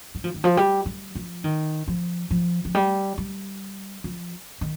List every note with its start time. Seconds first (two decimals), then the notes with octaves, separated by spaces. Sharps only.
0.15 G3
0.24 F3
0.34 D#3
0.44 F3
0.57 G3
0.86 G3
1.15 F3
1.44 D#3
1.88 F3
2.31 F3
2.65 F3
2.75 G3
3.18 G3
4.04 F3
4.61 D#3